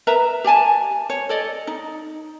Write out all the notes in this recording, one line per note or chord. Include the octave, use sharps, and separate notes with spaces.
A#4 B4 E5 A#5
G4 D5 G#5 A5
C#5
A4 D5 D#5
D#4